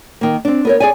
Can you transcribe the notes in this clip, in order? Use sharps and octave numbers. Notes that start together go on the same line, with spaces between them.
D#3 A#3
C4 D4
B3 A#4 C#5
G#4 D5 G#5